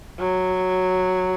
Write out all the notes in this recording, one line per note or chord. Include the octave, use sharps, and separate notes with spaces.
F#3